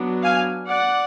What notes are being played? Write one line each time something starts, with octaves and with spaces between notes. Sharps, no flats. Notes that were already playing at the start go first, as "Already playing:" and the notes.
Already playing: F#3 B3 D4
F5 G#5
D5 F#5